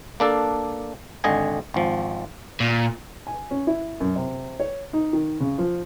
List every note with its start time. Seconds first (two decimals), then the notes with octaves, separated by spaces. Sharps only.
0.20 A#3 D4 A4
1.24 G#1 D3 D#5 G#5
1.74 G#1 F3
2.60 A#2
3.27 G#5
3.51 C#4
3.67 E4
4.00 F#2
4.16 C3
4.60 C#5
4.93 D#4
5.13 D#3
5.40 C#3
5.58 F3